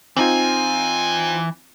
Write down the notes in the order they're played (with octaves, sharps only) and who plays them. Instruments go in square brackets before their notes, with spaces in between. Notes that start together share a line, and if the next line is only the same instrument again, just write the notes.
[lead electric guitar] E3 G#5 [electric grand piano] C4 D#4 F4